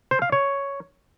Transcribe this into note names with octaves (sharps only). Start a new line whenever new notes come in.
C5
F5
C#5